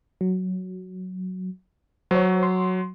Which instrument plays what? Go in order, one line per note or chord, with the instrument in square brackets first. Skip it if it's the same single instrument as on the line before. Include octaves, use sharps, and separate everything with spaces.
[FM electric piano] F#3
[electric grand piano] F#3 [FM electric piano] C5 C#5
[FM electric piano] C6